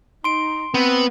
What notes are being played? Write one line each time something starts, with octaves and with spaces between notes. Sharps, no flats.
D#4 C6 D7
B3 C4